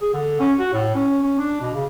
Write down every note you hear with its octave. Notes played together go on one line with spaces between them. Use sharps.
G#4
D3
C#4
F#4
A2
C#4
C#4
D4
B2
C#3